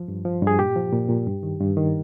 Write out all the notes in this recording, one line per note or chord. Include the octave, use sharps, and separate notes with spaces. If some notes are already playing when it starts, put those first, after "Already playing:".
Already playing: F3
G2
F3
G2
G#4
A#2 G4
F3
A#2
A#2
G2
D#3
G2
D#3